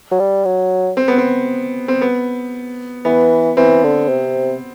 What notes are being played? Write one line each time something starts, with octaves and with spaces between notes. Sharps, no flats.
F#3
G3
F#3
C4
B3
C4
C4
B3
E3 B3
E3 C4
D3
C3